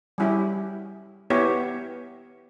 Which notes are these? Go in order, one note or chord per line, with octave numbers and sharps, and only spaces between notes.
G3 C#4 E4 G4
B3 E4 G4 C#5